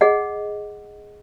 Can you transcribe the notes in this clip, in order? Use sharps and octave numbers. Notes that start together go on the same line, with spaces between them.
G#4 D#5 F#5